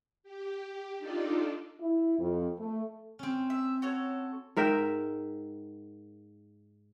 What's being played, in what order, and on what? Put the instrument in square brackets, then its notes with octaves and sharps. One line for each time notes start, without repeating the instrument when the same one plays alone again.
[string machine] G4
D4 D#4 F4 A4 D5
[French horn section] E4
F2
A3
[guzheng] C4 C#4
[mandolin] E5
F#4 A4 C#5
[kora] G#2 A#4 E5 G5